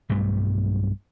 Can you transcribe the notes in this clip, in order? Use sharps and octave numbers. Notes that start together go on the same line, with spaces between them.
B1 G2 G3 A3